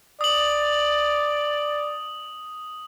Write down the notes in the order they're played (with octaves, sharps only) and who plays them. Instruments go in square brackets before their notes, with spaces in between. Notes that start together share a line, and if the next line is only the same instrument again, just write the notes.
[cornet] D5 [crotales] D#6 F#7